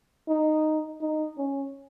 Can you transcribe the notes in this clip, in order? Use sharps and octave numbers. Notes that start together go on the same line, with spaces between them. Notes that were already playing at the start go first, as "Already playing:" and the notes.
D#4
D#4
C#4